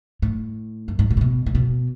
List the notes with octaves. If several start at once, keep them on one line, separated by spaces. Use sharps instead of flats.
A2
F#2
G#2
B2
A2
B2
A2
B2